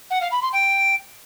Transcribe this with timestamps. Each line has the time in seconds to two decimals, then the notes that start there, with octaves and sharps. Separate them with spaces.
0.10 F#5
0.21 F5
0.31 B5
0.42 C6
0.52 G5